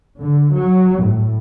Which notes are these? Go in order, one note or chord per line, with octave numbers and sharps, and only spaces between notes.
D3
F#3
A2